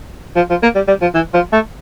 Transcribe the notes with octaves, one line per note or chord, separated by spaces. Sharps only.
F3
F3
A#3
G3
G3
F3
E3
F3
A3